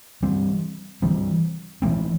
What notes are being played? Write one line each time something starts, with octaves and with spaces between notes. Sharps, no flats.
E3 G3 C4
E3 G3 C4
E3 A3 C4